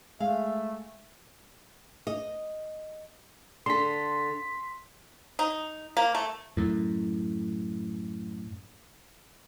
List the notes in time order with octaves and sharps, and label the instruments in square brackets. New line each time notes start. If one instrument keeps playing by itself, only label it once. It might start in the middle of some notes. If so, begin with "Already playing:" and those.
[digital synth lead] G#3 [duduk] A3 [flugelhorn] E5 [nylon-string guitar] F5
[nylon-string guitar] D#5
[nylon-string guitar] D3 A4 [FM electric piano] C6 B6
[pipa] D#4
A#3
A3
[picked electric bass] F#2 A2